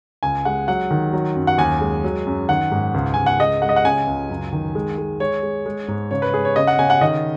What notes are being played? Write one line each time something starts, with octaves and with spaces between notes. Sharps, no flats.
C#2 G#5
G#3 F#5
F#3 F#5
D#3
F#3
F#2
F#5
D#2 G#5
G#3
F#3
F#2
D#3 F#5
G#2
C#2
C#2 G#5
F#5
G#3 D#5
G#3 F#5
D#5
F#5
C#3 G#5
C#2
F#2
D#3
G#3
G#3
G#3 C#5
G#3
G#3
G#2
C#3 C#5
B4
G#3 G#4
C#5
C#3 D#5
F#5
C#3 G#5
F#5
D#3 D#5